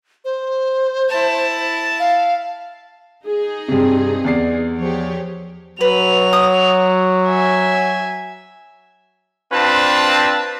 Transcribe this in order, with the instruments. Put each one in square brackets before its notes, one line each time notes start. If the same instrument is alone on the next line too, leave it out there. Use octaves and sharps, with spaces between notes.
[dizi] C5
[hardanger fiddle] E4 A5
[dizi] F5
[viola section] D#4 G#4
[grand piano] G2 C3 [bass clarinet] C4
[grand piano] E2 D5 C7
[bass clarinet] F3 [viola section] G4 G#4 C#5
[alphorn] F#3 [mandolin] B4 [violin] F7
[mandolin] D#6
[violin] E5 G#5
[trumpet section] C4 D4 F4 B4 A5